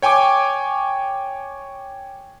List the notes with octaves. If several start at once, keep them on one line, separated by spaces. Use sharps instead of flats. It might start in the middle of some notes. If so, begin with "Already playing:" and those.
C#5 G5 G#5 C#6 D6